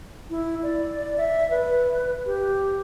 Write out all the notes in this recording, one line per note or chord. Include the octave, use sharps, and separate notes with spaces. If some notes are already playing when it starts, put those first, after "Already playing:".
E4
D5
E5
B4
G4